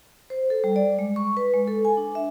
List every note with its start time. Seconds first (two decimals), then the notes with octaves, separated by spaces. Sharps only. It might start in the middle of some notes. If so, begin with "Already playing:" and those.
0.30 C5
0.50 A4
0.64 G3
0.76 D5
0.99 G#3
1.16 C#6
1.37 B4
1.54 G#3
1.68 A4
1.85 G#5
1.97 D4
2.15 E5